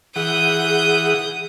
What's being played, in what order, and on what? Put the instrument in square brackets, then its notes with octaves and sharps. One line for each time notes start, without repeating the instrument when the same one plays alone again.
[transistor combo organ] E3 F#5 [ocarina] G#4 [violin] D#6 G6